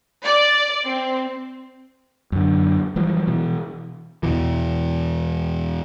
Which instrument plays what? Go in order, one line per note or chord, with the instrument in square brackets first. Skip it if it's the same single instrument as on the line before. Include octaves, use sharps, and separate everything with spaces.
[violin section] D5
C4
[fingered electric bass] F#2 D3
E3 F3 G3
B2 E3
[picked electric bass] E2 B2 E3